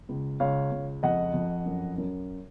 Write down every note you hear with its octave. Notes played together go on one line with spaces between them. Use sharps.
C#2
C#2 C#5 F5
C#2
F2 D#5 F#5
F2
F#2
F#2